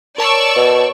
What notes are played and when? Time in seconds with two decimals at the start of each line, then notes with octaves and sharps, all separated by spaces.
0.18 A#4 C#5 D5 A5 C#6 E6
0.56 B2